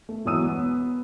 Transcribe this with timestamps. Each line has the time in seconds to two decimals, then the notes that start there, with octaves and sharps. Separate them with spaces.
0.09 A3
0.26 E1 E3 F#3 D#6 E6 D#7
0.48 B3